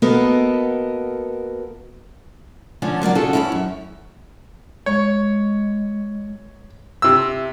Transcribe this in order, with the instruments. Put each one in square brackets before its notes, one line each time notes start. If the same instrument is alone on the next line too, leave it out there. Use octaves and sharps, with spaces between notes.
[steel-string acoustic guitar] A#3 B3 F#4 A4 A#4 D#5
D3 F3 A3 C#4 D4
F#3 A#3 F4 D5
C#3 G#3 C#4 F4 F#4 A4
E2 G2 C#4 D4 E4
F#2
[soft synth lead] G#3 [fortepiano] C#5
[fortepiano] C3 E6 [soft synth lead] E5